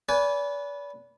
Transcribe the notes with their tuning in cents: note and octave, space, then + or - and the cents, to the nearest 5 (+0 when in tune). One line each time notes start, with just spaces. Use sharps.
B4 -10 D5 -35 G#5 +0